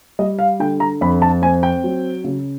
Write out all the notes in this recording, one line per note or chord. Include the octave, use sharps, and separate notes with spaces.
G3 D#5
F5
D3 G5
A#5
F2 B5
A5
C4 G#5
G5
F#3
C#3